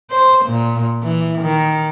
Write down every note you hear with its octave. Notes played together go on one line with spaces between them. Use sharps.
C5
A#2
E3
D#3